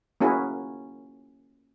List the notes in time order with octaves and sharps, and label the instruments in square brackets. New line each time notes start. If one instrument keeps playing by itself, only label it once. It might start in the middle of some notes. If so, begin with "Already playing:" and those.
[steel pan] A#3 C#4 E4 F#4 G#4